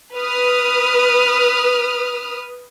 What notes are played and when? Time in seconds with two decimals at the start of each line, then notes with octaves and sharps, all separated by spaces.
0.15 B4 D#6 F6